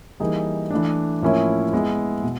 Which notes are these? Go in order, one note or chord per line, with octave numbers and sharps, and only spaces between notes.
E3 G3 A#3 D#4 G#4
E3 A3 D4
A2 F3 A#3 C#4 E4
G#3 B3 E4
B2